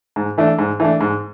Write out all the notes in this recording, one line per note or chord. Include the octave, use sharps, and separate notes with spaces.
G#2
E3 A3 D4
G#2
E3 A3 D4
G#2